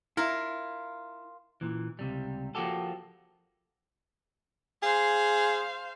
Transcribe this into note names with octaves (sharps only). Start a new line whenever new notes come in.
E4 F4 A#4
A#2 E3
C#2 C3 G3
F3 A#3 F#4 G4 A4
G#4 C5 F5